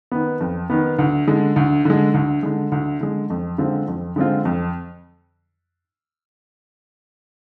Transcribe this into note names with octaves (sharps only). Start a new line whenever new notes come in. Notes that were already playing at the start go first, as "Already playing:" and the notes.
D#3 B3
F2
D#3 B3
D2
D3 G#3
D2
D3 G#3
D2
D3 G#3
D2
D3 G#3
F2
D3 G#3 C4 F4
F2
D3 G#3 C4 F4
F2